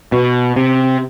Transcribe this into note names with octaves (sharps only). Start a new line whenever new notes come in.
B2
C3